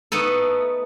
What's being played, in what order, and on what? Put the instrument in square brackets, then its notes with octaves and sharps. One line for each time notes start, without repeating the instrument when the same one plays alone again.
[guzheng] A3 B3 D#4 A4